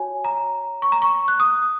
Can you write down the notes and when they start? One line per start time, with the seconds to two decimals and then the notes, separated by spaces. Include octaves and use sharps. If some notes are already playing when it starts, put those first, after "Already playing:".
Already playing: F#4 C#5 G#5
0.24 A#5
0.82 C#6
0.92 A#5
1.02 C#6
1.28 F#6
1.40 D#6